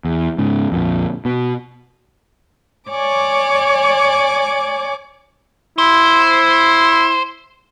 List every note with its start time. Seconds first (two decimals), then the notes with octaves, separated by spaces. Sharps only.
0.05 E2
0.38 G#2 C#3
0.72 A#1 F2
1.25 B2
2.90 C#5 D5 G#5 D6
5.78 E4 C5